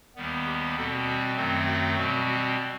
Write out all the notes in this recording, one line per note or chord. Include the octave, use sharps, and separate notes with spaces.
D#2 D#3 G3 B3
G4
B2 G3 C4 A4
F#4
F#2 D#3 F#3 A3 C4
F#4
B2 G3 C4 F#4
F#4